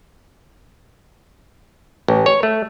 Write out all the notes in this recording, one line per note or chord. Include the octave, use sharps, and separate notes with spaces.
A1
C#5
A3